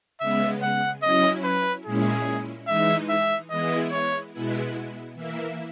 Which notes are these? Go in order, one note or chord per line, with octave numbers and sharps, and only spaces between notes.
C#3 G#3 B3 E5
F#5
F#3 C#4 E4 D#5
B4
A#2 G#3 C#4 E4 G#4
E3 G#3 D#4 E5
E5
E3 G#3 B3 E4 D#5
C#5
B2 G#3 B3 E4
E3 A#3 E4